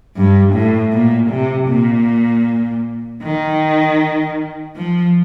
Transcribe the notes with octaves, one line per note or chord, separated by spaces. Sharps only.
G2
A2
A#2
C3
A#2
D#3
F3